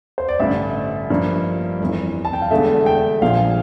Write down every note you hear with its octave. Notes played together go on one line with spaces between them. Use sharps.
C5
D5
A1 G2 D3 E5
G2 F3 A#3
G1 F2 E3
A5
G5
F5
E1 E2 D3 A3 E5
G5
A#1 A#2 F3 F5